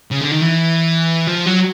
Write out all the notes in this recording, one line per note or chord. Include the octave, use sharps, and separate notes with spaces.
C#3
D3
D#3
E3
F3
F#3